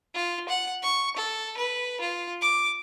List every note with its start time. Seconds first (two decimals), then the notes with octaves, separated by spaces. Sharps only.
0.15 F4
0.49 F#5
0.83 C#6
1.17 A4
1.57 B4
2.01 F4
2.41 D6